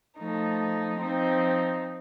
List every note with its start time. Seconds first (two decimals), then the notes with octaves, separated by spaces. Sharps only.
0.17 F3 A3 D#4
0.97 F3 C4 D#4